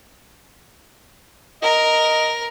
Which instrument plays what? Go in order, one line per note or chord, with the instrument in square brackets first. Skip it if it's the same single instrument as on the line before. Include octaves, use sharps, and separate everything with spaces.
[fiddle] A#4 [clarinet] D#5